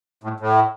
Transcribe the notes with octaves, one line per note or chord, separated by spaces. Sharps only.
A2
A2